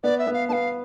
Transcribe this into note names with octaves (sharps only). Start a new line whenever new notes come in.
B3 D5
E5
B3
F5
B3 F5 A5